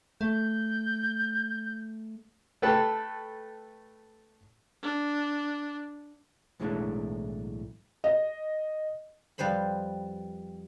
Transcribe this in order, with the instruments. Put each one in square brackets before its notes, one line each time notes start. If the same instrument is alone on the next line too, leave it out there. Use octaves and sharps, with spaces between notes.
[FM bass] A3 [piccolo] G6
[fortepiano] A3 A4 B4 G5 A5
[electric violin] D4
[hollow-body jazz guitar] B1 A2 E3 G#3 A3 D4
[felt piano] D#5
[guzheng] F2 G3 B4 C5 B5